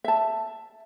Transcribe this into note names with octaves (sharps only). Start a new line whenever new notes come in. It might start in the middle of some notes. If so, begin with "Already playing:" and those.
E5 A5